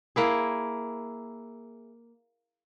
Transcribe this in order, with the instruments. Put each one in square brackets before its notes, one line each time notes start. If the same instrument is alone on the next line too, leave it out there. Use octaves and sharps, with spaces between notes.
[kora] A#3 E4 G#4